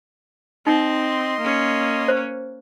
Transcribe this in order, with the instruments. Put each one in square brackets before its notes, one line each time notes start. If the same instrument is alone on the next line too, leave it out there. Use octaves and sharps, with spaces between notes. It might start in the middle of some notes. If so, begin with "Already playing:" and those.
[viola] C4 [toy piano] D#4 [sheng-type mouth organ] D#5 C6
[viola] A#3 C#4
[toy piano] C5